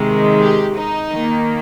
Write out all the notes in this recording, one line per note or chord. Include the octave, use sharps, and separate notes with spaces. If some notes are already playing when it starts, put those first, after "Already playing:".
Already playing: C3 D#3 G#3
G4
D#4
D#3 A#3